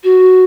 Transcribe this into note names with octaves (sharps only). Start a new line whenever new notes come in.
F#4